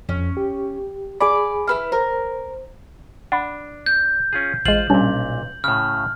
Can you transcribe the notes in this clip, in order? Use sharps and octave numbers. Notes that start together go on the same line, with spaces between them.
F2 C#4
G4
G#4 D5 G#5 B5 D6
E4 B4 F6
A#4 C5
D4 F#5 B5
G6
C#4 F4 G#4
A1 G#3 F4 C5 F#7
B1 A#2 G3 C#4 D4
A2 C#3 F6